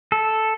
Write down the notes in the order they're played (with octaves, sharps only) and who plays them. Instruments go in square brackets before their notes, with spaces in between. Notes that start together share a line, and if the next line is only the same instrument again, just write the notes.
[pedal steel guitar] A4